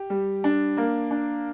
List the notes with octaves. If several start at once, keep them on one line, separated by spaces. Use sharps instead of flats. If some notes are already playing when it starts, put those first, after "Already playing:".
Already playing: G4
G3
D4
A#3
D4